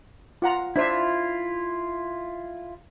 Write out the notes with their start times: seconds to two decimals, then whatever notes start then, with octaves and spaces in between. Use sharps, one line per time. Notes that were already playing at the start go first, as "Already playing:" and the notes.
0.42 F4 F#5 A#5
0.76 D4 E4 F4 C5 E5